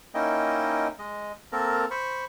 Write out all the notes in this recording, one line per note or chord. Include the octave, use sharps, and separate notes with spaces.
A#3 C#4 D#4 E4 D#5 G5
G#3 D#5
A#3 C4 A4 A#4 A#5
C5 B5 C#6